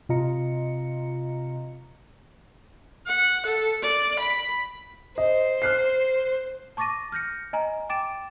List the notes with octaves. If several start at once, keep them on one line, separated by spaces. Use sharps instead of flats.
C3 F4 D#5 A#5 C#7
F#5
A4
D5
B5
C5 D#5
F6 F#6 C7
A5 C#6 D6 A6 A#6 D#7
F6 G6 A#6 C#7
D#5 G#5 A#5
G5 D6 A6 D7 E7